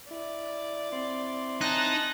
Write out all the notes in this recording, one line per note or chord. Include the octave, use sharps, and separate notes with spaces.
E4 D5
C4 E4 C6
D#4 G#5 A5 F#6 A#6